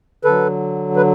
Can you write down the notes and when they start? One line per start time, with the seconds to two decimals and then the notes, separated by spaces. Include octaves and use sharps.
0.25 D3 F#3 A4 B4
0.96 B4